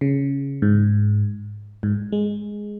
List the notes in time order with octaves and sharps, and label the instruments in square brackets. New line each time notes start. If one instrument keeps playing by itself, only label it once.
[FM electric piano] C#3
G#2
G#2
G#3